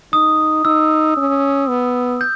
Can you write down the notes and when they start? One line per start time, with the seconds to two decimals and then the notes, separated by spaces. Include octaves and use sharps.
0.13 D#4 D#6
0.65 D#4 E6
1.17 C#4
1.69 B3
2.21 G6